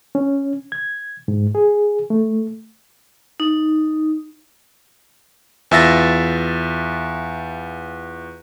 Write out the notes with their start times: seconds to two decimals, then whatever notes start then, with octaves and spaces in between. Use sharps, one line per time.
0.15 C#4
0.72 G#6
1.28 G#2
1.55 G#4
2.10 A3
3.40 D#4
5.71 E2 F4 E5 E6 A6 A#6